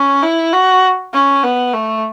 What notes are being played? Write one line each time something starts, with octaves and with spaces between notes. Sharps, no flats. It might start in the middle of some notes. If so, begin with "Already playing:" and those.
Already playing: C#4
E4
F#4
C#4
B3
A3